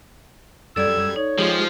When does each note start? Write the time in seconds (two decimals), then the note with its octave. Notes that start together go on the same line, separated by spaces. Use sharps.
0.76 F#2 G3 A4 D5 E6 G#6
1.16 D#4 C#5
1.38 F3 G#3 F4 G4 G#4